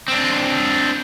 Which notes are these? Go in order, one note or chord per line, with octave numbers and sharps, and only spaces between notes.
C4 D4